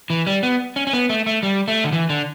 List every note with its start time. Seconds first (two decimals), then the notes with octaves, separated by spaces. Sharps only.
0.10 E3
0.27 G3
0.43 B3
0.76 C#4
0.87 C#4
0.93 B3
1.09 A3
1.26 A3
1.43 G3
1.68 A3
1.84 D3
1.92 E3
2.09 D3